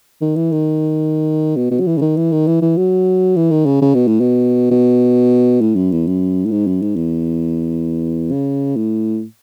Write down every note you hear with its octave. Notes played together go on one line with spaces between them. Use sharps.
D#3
E3
D#3
B2
B2
F#3
E3
C#3
D#3
E3
D#3
E3
E3
F#3
E3
D#3
C#3
C#3
B2
A2
B2
B2
A2
F#2
E2
F#2
A2
G#2
F#2
G#2
E2
C#3
A2